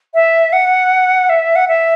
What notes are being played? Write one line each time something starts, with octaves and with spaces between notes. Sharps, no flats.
E5
F#5
E5
F#5
E5